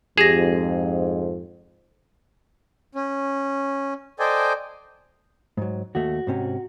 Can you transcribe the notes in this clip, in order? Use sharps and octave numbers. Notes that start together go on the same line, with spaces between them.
F2 G#2 G4 G#4 A#6
C#4
A4 C5 D5 D#5 G5 G#5
G#2 F#3
D#2 A3 F#4
G#2 C3 C#4